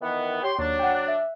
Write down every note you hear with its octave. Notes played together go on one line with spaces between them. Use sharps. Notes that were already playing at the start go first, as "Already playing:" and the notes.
D#3 E3 B3
G4 C#5 C6
D#2 F#3 D4 A6
F#5 G5
F#6
E5